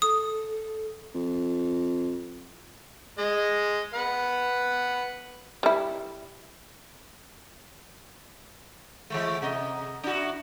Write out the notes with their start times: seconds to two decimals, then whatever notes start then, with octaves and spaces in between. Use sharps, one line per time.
0.02 A4 D#6
1.15 F2
3.19 G#3 D#5
3.94 B4 F#5
5.63 G3 E4
9.10 E3 G#3 A3
9.42 C3 A4 D#5
10.04 D4 E4 F#4